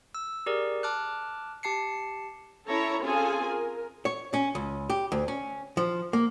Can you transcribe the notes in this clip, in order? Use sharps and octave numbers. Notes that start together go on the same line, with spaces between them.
E6
G4 G#4 A#4 D5
A5 D6 F6 F#6
G4 A5 C7 C#7
C#4 E4 A4 C#5 A#5
C4 C#4 F4 G#4 A4 G#5
A#4
C#5
C#4
C#2
G4
D2
C#4
F3
A#3